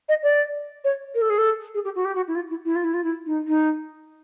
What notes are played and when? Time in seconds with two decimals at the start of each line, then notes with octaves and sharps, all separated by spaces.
0.09 D#5
0.23 D5
0.84 C#5
1.15 A#4
1.21 A4
1.30 G#4
1.38 A4
1.74 G#4
1.84 G4
1.95 F#4
2.05 G4
2.15 F#4
2.28 E4
2.35 F4
2.50 E4
2.65 E4
2.75 F4
2.84 E4
2.94 F4
3.04 E4
3.26 D#4
3.47 D#4